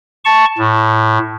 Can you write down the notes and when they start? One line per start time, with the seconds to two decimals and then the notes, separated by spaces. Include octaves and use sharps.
0.25 A5 C#6
0.58 A2